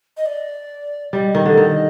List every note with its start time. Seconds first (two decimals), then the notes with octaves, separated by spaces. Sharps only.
0.17 D#5
0.26 D5
1.13 G3 D#5
1.35 D#3
1.46 D3
1.57 D#3